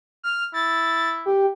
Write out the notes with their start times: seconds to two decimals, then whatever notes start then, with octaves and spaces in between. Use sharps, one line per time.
0.23 F6
0.54 E4 A6
1.26 G4